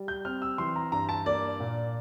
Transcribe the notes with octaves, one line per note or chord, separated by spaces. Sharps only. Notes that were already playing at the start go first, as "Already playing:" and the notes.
Already playing: G3
G6
C4 F6
E6
E3 C6
A#5
G2 A#5
A5
A#3 D5
A#2